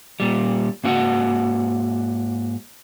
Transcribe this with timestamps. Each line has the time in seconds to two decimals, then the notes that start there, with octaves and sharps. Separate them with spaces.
0.20 A#2 G3
0.84 G#2 A#3 F#4 F#5